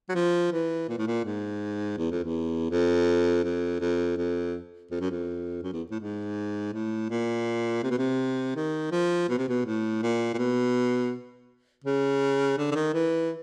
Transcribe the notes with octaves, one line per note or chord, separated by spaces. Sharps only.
F#3
F3
E3
A#2
A2
A#2
G#2
E2
F2
E2
F2
F2
F2
F2
F2
F#2
F2
F#2
E2
A2
G#2
A2
A#2
C3
B2
C3
D#3
F3
B2
C3
B2
A2
A#2
A#2
B2
C#3
D3
D3
D#3
E3